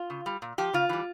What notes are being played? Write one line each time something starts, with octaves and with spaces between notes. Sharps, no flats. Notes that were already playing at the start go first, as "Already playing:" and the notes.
Already playing: F4
C#3
G3
A#2
F3 G4
C#3 F4
E3 G3